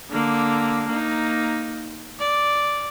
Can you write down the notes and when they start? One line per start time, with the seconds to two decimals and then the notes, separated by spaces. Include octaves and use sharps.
0.10 D3 A#3
0.87 A#3 D#4
2.19 D5